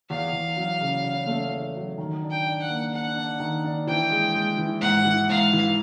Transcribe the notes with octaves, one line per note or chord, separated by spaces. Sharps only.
E2 F5
E2
F#3
C#3
C#3
A3
E2
F#3
D#3
D4
G5
D4
F#5
A#3
D4 F#5
D4
D#3
D4
E3 G5
G#3
G#3
E3
G#2 F#5
E3
G#2 F5
E3